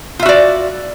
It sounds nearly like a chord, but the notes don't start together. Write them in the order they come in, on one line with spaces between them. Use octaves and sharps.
F4 E5 F#4 D5